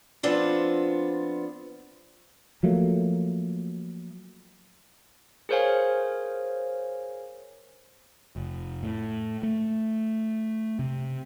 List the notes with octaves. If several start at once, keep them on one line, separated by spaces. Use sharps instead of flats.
F3 B3 C4 D4 F4
F3 F#3 A3 A#3
G#4 A#4 C5 C#5 F5 G#5
F1
A2
A3
C3